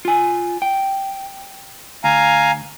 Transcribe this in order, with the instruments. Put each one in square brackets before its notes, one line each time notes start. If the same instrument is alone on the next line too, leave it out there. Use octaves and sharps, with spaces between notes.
[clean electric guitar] F4 G#5
G5
[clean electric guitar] D2 [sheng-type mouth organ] F5 G#5 A#5